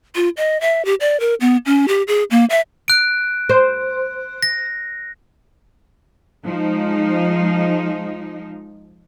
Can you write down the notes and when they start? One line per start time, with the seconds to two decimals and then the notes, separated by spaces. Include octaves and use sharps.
0.16 F4
0.37 D#5
0.61 E5
0.85 G4
1.01 D5
1.20 A#4
1.41 B3
1.66 C#4
1.88 G4
2.08 G#4
2.31 A#3
2.50 E5
2.88 F#6 D7
3.49 C5
4.43 A#6
6.45 F3 G#3 D#4